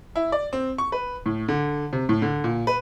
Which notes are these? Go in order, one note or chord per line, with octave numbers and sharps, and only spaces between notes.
E4
D5
C4
C#6
B4
A2
D3
C3
A2
D3
A#2
B4